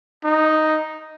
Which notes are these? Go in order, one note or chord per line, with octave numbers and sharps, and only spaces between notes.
D#4